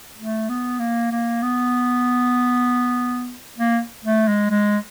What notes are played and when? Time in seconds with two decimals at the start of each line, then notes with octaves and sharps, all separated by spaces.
0.18 A3
0.49 B3
0.79 A#3
1.11 A#3
1.42 B3
3.58 A#3
4.04 A3
4.28 G#3
4.51 G#3